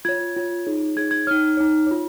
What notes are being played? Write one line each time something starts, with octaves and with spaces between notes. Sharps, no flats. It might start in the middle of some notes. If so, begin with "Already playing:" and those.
F4 C#5 G#6
F4 C#5
D#4 G#4 C#5
D#4 G#4 C#5 G#6
G#6
D#4 C#5 F6
D#4 C#5
F4 C#5